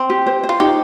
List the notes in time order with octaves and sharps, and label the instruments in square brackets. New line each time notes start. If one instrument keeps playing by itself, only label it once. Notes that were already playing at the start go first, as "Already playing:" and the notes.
Already playing: [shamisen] C4
[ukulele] G4
C5
C5
[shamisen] F4
[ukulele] D#4 [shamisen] G4